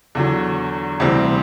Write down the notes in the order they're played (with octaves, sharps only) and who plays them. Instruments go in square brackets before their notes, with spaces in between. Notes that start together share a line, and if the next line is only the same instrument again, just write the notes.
[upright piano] E2 D3 F#3
D2 C3 E3 G3 C4